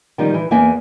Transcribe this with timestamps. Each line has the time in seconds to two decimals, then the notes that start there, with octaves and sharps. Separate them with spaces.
0.18 D#3 F3 G3 D#4
0.34 E3
0.51 E2 A#3 E5 G#5